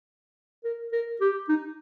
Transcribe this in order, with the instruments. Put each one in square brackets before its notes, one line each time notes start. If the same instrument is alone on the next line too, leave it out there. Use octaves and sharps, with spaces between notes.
[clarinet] A#4
A#4
G4
D#4